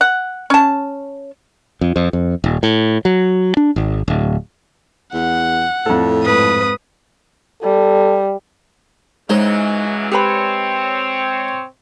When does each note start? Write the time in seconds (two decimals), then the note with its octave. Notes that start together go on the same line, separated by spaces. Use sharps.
0.01 F#5
0.50 C#4 A5
1.81 F2
1.96 F2
2.13 F2
2.44 D#1
2.63 A2
3.05 F#3
3.57 D4
3.76 G#1
4.08 D1
5.14 E2 F#5
5.86 F2 A2 A4
6.24 G#2 B4 D#6
7.63 G3 A4
9.30 C#3 E3 F#3 G#3 D#4 C5 C#5
10.12 C4 G4 B4 C#5 B5